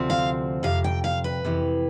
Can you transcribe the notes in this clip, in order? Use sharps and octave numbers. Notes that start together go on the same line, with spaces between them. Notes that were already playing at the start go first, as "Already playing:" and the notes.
Already playing: D2 C3 F3 C4
F5
F2 C3 F5
G5
F5
B4
F2 C3 E3